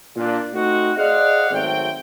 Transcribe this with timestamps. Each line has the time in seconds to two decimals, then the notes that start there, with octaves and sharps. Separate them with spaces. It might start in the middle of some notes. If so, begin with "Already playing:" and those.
0.16 A#2 D4
0.53 A3 C4 D#4 F#4
0.96 G#4 C5 D5 D#5 F5 F#5
1.51 G#1 F#3 A3 C4 G5